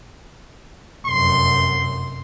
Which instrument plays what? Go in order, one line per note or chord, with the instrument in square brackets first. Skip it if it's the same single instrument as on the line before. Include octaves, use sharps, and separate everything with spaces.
[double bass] F1 F#2 [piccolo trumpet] C6